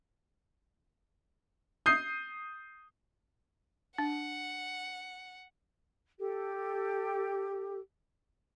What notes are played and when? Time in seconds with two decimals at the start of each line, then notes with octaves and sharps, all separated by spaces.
1.86 D#6 G6 C7
3.98 D4 F#5
6.19 G4 A4